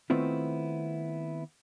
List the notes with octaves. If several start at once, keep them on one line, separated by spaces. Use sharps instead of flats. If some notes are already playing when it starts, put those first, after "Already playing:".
D#3 A3 B3 C4 E4 F4